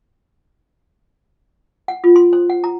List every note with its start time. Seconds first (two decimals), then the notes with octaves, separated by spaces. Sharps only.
1.88 F#5
2.04 F4
2.16 C6
2.33 C5
2.50 F#5
2.64 A#5